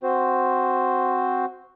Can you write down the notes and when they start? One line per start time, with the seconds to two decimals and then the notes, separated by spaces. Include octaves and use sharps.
0.03 C4 F#4 C5